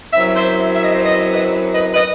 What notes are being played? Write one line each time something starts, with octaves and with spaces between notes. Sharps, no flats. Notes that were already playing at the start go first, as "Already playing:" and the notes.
F#2 F#3 C4 E4 E5
C5 E5
E5
D#5
C5
B4 D#5
B4 D#5
B4 D#5
B4 D#5